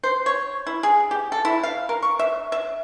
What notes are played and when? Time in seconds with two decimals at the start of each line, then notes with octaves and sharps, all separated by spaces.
0.03 C5
0.26 C#5
0.67 E4
0.83 G#4
1.11 G4
1.32 A4
1.45 E4
1.63 F5
1.89 A#4
2.02 C#6
2.19 E5
2.52 E5